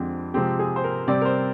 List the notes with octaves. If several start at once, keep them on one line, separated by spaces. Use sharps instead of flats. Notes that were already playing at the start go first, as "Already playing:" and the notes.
Already playing: F2 D3 G#3 C4 G4
C3 F3 G#3 C4 G4
G#4
C5
A#4
C3 G3 C4 D5
A#4
C5